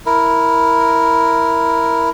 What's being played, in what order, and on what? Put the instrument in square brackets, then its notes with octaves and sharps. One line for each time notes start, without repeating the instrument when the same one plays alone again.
[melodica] E4 A#4